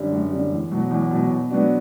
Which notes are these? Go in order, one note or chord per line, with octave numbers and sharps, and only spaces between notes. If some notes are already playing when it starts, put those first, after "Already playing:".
Already playing: F#2 D3 G3
F#2
D3 G3
E2
B2 F#3
E2
B2 F#3
B2
F#3 B3 D4 F#4